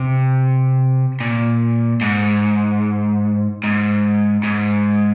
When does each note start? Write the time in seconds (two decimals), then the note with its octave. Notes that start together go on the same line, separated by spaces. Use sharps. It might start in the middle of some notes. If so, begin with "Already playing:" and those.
Already playing: C3
1.20 A#2
2.01 G#2
3.64 G#2
4.43 G#2